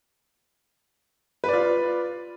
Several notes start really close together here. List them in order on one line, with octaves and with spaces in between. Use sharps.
B4 D5 F4